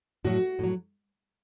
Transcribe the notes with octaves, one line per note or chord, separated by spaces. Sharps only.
A2 F#3 F#4
A2 F#3